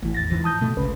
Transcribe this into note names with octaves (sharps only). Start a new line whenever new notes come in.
A1 A2 E3
E2 A6 A#6
G#2 E3 F3
A5 D#6 G6
B2 A3
G#1 C#2 C#3 B4